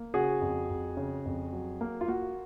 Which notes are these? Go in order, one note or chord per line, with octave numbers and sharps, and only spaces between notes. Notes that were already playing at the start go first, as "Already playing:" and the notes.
Already playing: A#3
C#3 F#4 G#4
F2
F2
C#3
F2
F#3
A#3
F4
A#3 F#4